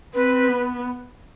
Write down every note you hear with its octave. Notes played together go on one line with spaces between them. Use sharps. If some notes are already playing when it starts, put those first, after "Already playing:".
C4 B4
B3